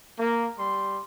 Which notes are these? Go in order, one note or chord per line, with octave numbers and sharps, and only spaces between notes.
A#3
G3 C6